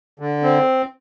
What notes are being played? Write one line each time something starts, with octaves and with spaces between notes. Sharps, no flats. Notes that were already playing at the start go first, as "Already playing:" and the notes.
D3
C4